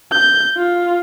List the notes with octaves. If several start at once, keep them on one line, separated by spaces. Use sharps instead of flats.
G6
F4